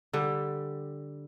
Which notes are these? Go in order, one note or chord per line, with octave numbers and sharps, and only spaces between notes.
D3 G3 G4